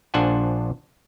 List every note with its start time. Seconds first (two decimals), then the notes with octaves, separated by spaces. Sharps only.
0.14 A#1 D4 F4 C5 F#5 G#5